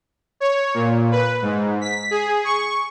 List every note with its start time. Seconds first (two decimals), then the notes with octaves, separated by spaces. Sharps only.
0.40 C#5
0.74 A#2
1.11 B4
1.42 G#2
1.81 B6
2.11 G#4
2.45 C#6